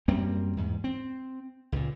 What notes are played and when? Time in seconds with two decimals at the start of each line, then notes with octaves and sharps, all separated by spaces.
0.08 F#2 G3 A#3 C4
0.57 E2 G#2
0.84 C4
1.72 C#2 A#2